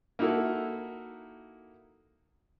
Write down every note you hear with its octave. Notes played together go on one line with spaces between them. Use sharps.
A#3 D#4 E4 F#4 A4